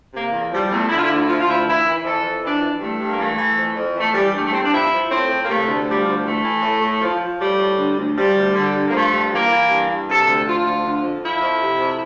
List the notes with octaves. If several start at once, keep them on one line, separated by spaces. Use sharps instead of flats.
C3 A#3
E2
F3 G3
E2 A3
D3 E4
F4
E4
D2 F4
E4
F4
F3 E4
F4
D2 E4
E3 E4
E3
F2 A4
F2
E3 D4
E3
G2 A3
G2
A#3
E3 A3
E3
F2
F2
E3 A3
E3 G3
G2 A3
A3
G2 C4
D4
F3 E4
F3
A2 C4
A2
A#3
C3 A3
D2
F3 G3
D2
E3 A3
E3
A2
A2
F3
F3
A2 G3
A2
D3
D2
F3 G3
D2
D3
G2
A#3
F3 A3
G2
E3 A#3
E3
G2
G2
C3 A4
D2
F3 F4
D2
D3
F2
F3 E4
F2
C3
F2